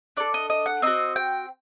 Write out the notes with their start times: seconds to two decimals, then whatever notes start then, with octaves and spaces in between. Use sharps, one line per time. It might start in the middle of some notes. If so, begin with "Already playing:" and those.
0.17 D4 A4 D5
0.34 D#5
0.50 D#5
0.66 F#5
0.82 C4 D#4 F#4 D#5
1.16 G5